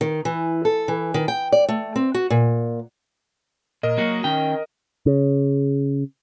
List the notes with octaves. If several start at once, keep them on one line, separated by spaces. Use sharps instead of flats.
D#3
E3
A4
E3
D#3
G5
D5
A3
C4
F#4
A#2
A#2 A#4 D#5
F#3 A#3 F#4
D#3 C#4 G5
C#3